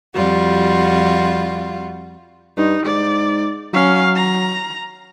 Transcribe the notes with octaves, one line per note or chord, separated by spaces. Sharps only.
F2 G3 F4 F#4
G2 D#4
G#2 D5
F#3 C#4 F5
A#5